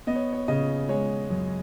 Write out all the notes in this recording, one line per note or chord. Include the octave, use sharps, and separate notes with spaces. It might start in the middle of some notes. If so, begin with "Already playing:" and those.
B3 D#5
C#5
C#5
C#3 D#5
G#3 C#5
F#2